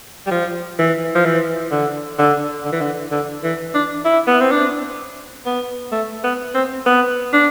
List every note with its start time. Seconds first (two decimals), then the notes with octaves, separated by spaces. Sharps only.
0.27 G3
0.31 F3
0.79 E3
1.15 F3
1.26 E3
1.71 D3
2.19 D3
2.65 D3
2.72 E3
2.81 D3
3.11 D3
3.44 E3
3.74 D4
4.05 E4
4.27 B3
4.41 C4
4.52 D4
5.46 B3
5.92 A3
6.24 B3
6.54 C4
6.86 B3
7.33 D4